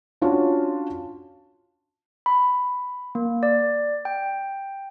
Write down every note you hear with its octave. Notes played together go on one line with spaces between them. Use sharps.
C#4 D4 F4 F#4 C#5 A5
B5
A#3
D5
G5